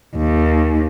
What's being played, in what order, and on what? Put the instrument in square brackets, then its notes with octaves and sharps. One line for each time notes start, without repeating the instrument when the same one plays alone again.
[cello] D#2